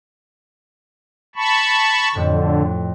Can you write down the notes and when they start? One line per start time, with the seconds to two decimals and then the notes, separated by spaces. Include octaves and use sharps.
1.36 A5 B5 C#6
2.15 F2 A2 D3